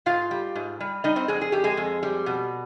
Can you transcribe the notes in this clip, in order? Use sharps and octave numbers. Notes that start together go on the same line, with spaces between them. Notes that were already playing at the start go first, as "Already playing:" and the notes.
G#2 F4 F5
G3
G#2
G3
G3 D#4 D#5
C4 C5
F2 G#3 G#4
G#4
F2 G4
G#3 G#4
F2
G3
B2